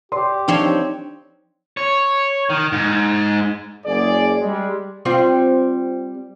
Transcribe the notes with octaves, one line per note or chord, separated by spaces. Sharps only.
G4 D5 C6
F3 C4 D4 D#4 C#5
C#5
D#3
G#2
F#1 G#4 D5
G3 G#3
G3 C4 F4